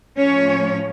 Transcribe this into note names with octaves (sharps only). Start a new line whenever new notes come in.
A2 F3 A3 C#4 C#5